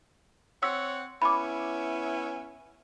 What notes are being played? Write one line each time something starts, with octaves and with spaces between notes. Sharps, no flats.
C4 C#5 F#5 E6
B3 C#4 E4 B5 D6